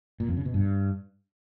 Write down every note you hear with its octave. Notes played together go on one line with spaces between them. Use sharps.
A#2
F2
C#3
B2
G2